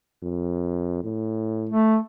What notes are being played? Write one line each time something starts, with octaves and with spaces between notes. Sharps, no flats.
F2
A2
A3